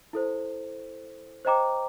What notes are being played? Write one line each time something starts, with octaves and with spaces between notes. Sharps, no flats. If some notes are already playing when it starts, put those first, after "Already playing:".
E4 A4 C5
C5 D#5 G5 A#5 D6